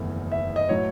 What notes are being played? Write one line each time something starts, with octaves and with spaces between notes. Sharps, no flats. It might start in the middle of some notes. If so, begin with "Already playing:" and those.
Already playing: F#1 E2 D#3 A3
E5
D#5
A2 F#3 C#5